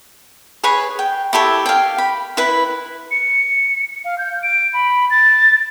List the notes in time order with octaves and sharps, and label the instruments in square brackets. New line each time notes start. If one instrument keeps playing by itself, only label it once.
[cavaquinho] G#4 B4 C#5 B5
G5
E4 G4 A4 C#5
F5 G5
B5
E4 B4
[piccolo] C#7
F5
G6
D7
B5
A6